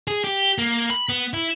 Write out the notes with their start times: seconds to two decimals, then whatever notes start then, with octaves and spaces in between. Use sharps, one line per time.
0.07 G#4
0.24 G4
0.58 A#3
0.90 B5
1.09 B3
1.33 E4